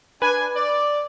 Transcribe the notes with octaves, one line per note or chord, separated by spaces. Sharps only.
D4 B4 G#5
D5